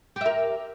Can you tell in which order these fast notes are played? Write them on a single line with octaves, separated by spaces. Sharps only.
G4 E5 A#4